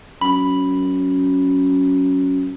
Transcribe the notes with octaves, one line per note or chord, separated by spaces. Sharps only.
F#2 B5